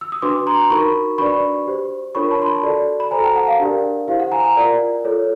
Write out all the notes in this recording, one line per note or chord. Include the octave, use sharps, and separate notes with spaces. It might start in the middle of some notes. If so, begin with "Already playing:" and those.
E6
D#6
D4 F#4 B4 C6 D6
A#5 C6
D#4 F#4 A#4 B5 C#6
D4 F#4 B4 D5 B5 C#6
G4 C5
D4 F4 A#4 C#5 B5 C#6
A5 B5
C6
A5 B5
F#4 A4 D5
B5
F#4 A4 C5 G#5 A#5
G5 A5
F#5
F5 G5
D4 G4 A#4 D5
E4 G4 C5 F5
F#5
G#5 A#5
G#5 A#5
F4 A#4 D5
F4 A4 C#5